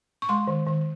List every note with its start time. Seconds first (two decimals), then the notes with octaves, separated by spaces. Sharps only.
0.22 C#6
0.29 G#3 C6
0.47 D#3
0.66 D#3